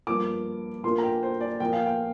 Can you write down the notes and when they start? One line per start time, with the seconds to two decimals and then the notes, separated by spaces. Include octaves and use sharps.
0.07 G2 F3 A#3 D6
0.83 A#2 A#3 D4 C6
0.98 A#5
1.03 G5
1.23 C5
1.41 D5
1.60 A#2 F3 A#3 G5
1.73 F5
1.86 G5